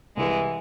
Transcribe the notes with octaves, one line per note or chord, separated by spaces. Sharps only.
C2 E3 G#3